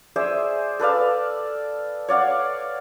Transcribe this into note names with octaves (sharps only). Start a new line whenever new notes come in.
G#4 C5 D5 E5
A4 B4 D5 F5
C#5 D5 F5 F#5